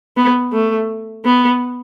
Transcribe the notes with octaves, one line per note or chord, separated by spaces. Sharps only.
B3
A3
B3